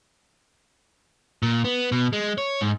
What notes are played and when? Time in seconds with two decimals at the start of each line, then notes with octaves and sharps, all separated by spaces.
1.43 A#2
1.64 B3
1.92 B2
2.13 G#3
2.38 C#5
2.61 G#2